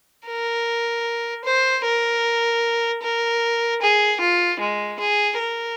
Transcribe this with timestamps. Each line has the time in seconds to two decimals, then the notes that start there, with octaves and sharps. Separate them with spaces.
0.27 A#4
1.45 C5
1.85 A#4
3.03 A#4
3.81 G#4
4.20 F4
4.60 G#3
5.00 G#4
5.39 A#4